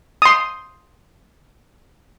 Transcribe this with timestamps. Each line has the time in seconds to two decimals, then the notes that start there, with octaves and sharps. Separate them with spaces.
0.22 C6 D#6